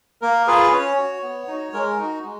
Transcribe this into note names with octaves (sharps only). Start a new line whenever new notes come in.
A#3 A#4
F4 G#4 B4
C#4 C#5
F#4
B3
D#4 F#4
G#3 A#4
D#4 F#4
G#3